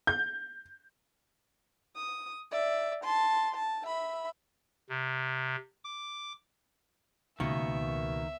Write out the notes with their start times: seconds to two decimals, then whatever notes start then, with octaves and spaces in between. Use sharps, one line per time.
0.07 G6
1.96 D#6
2.51 D5 E5
3.04 A5 C6
3.55 A5
3.87 E5 B5
4.89 C3
5.84 D6
7.40 C#2 B2 D#3 A#3 E5 C#6